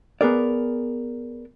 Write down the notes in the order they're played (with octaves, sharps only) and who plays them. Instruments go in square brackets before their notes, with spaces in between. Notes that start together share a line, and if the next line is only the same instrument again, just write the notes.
[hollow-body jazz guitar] B3 G#4 A#4 D5